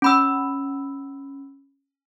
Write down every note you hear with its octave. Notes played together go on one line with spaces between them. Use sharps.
C#4 B5 E6